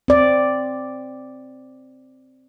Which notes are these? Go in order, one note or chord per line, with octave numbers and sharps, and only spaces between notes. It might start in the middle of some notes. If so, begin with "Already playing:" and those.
C4 D5